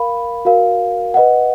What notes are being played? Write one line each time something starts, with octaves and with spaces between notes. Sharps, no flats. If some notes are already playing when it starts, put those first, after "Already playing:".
Already playing: A#4 F5 B5
F#4 A#4 F5
B4 D#5 F#5